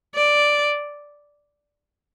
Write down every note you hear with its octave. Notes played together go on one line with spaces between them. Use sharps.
D5